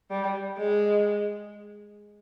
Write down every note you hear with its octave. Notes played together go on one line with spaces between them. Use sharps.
G3
G#3